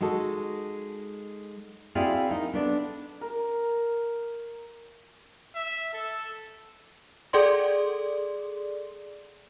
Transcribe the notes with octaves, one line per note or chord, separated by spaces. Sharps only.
G#3 D#4 F#4 A4
C4 E4 F#4 G#4 D5 F5
D#4 A#4
B3 D4 A4
A#4
E5
A4
G#4 A4 D5 C6